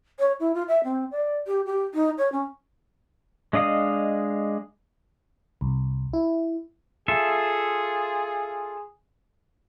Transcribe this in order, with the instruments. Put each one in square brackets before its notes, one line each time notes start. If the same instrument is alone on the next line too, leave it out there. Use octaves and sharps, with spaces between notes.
[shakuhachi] C#5
E4
F4
E5
C4
D5
G4
G4
D#4
C#5
C#4
[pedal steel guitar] G#3 D4 D#5 F5 D#6
[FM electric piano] C2
E4
[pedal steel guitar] F4 A4 E5 [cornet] G#4